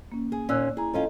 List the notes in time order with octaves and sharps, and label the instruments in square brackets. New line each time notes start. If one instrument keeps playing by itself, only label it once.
[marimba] A#3 C#4
[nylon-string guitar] G#4
[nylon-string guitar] D#2 A#2 C#4 [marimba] D5 E6 F#6
[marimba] E4 A#5 [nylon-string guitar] G#4
[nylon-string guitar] F3 C#4 F4 [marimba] A4 D#5